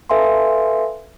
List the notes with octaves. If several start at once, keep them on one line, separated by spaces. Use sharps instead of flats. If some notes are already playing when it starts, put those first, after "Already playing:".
A4 B4 E5 F5 G#5 C6